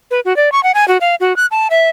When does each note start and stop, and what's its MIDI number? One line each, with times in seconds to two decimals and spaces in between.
0.11 0.20 71
0.25 0.36 66
0.36 0.52 74
0.52 0.63 85
0.63 0.72 78
0.75 0.87 80
0.88 0.98 66
1.01 1.15 77
1.20 1.36 66
1.36 1.46 90
1.51 1.68 81
1.70 1.89 76